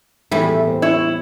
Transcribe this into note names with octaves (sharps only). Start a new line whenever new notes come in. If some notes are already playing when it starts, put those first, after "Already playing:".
E2 A2 G3 E4
C4
E4 C#5